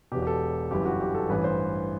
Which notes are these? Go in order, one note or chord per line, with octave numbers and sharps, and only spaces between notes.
E1 E2 B2 G4
G4
A4
G1 F#2 E3 G4
F#4
G4
A4
A1 G2 E3 B4
C5